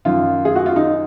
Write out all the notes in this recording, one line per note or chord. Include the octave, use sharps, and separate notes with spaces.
F#2 D#3 F4
G#4
F#4
F4
D#4